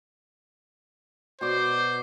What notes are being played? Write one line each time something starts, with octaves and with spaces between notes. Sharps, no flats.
B2 C5 D5